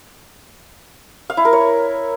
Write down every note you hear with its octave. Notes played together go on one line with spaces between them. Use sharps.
F5
E4
A#4
C#5